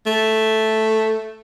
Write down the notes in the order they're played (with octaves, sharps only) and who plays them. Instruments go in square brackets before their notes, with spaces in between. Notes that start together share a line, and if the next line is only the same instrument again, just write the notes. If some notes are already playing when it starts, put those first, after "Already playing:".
[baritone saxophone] A3